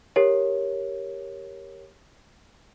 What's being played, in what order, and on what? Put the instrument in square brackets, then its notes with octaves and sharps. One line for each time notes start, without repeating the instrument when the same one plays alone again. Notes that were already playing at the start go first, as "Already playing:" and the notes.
[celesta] G4 A#4 C#5